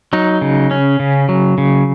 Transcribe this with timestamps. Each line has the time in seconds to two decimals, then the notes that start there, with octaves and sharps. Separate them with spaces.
0.13 F#3 D#4
0.41 C#3
0.71 C#4
1.00 C#3
1.29 F#3
1.58 C#3